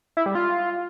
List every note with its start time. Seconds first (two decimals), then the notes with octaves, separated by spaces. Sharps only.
0.17 E4
0.26 G3
0.35 F4